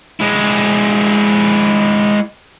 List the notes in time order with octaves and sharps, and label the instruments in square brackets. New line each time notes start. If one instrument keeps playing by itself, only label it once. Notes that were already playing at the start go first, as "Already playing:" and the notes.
[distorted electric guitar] G#3 E4